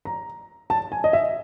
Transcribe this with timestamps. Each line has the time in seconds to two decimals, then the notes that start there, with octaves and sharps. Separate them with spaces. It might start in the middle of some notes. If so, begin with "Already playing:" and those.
0.05 A#5
0.70 A5
0.92 G#5
1.04 D#5
1.13 E5